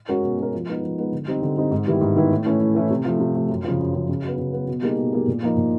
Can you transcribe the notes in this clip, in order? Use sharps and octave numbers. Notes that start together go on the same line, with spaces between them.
G#3 C#4 F#4 A#4
B2
G#3 C#4 F#4 A#4
F3
G#3 B3 D#4
F3
G#3 B3 D#4
D3
G3 C4 D#4
D3
G3 C4 D#4
G#2
D#3 G3 B3 E4
G#2
D#3 G3 B3 E4
A2
E3 A3 C#4 E4
A2
E3 A3 C#4 E4
C3
F3 A3
C3
F3 A3
F#2
C#3 F3
F#2
C#3 F3
C#3
F#3 B3
C#3
F#3 B3
B2
G3 A#3 D#4 G#4
B2
G3 A#3 D#4 G#4
A#2
F3 A#3 D#4
A#2